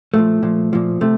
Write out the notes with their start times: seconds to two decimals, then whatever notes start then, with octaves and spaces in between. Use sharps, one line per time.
0.14 A#2 F3 A3
0.43 A#2 F3
0.73 A#2 F3
1.01 C3 A3